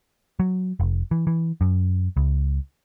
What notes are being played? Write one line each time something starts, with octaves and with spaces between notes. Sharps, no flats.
F#3
F1
E3
E3
F#2
C#2